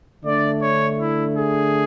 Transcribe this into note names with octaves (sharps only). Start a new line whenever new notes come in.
D3 A3 D4 D5
C#5
E4
G#4